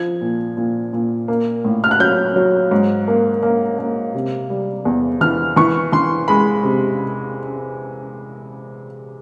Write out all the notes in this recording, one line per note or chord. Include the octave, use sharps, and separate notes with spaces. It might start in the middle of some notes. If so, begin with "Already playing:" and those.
Already playing: F3 G#6
A#2
A#2
A#2
A#3
A2
F6
F#6
F#3 G6
F#3
G#2
A#3
A#3
A#3
C3
G3
E2
E3 F6
E3 C#6
E3 C6
G#3 B5
C3